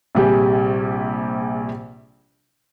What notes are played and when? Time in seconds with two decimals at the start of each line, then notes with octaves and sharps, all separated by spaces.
0.15 A#1 C3 G3 G4 G#4